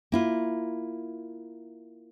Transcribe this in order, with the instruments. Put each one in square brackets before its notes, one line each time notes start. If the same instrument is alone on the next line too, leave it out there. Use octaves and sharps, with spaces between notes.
[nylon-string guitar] A#3 E4 F4